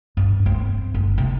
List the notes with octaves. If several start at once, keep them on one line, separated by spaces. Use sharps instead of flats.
G2
C4
G1
C3